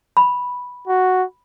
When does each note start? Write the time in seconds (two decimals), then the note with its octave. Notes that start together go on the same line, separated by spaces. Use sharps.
0.17 B5
0.87 F#4